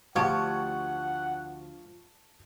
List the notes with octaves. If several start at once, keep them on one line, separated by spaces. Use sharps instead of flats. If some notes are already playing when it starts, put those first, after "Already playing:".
D2 F3 G4 F#5 A5 C#6 G#6